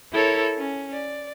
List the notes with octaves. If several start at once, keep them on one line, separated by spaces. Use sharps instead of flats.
E4 A4 A#4 C#5
C#4
D5